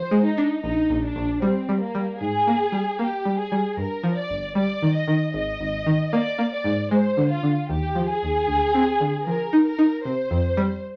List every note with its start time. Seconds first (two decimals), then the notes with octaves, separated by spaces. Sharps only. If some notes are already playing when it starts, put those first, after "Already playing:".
Already playing: F3 C5
0.11 G#3
0.25 D#4
0.38 D4
0.64 A#1 D#4
0.90 A#1
1.02 D4
1.16 A#1
1.42 G3 C4
1.69 G3
1.81 A#3
1.95 G3
2.21 G#2 G#4
2.47 A#3
2.72 G3
2.99 A#3 G4
3.25 G3
3.38 G#4
3.52 G3
3.77 G2 A#4
4.03 F3
4.17 D5
4.30 G1
4.55 G3 D5
4.82 D#3
4.94 D#5
5.08 D#3
5.34 G#1 D#5
5.61 G#1
5.86 D#3
6.12 A#3 D5
6.38 A#3
6.51 D5
6.64 G#2
6.91 G#3 C5
7.17 D3
7.30 F4
7.43 D3
7.70 D#2 G4
7.95 F3
8.09 G#4
8.22 D#2
8.47 D2
8.74 C4
9.01 D3
9.26 F3 A#4
9.53 D#4
9.66 A#4
9.79 D#4
10.05 C3 C5
10.31 F2
10.57 G3